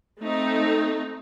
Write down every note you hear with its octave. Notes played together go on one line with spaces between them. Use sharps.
A3 C4 D#4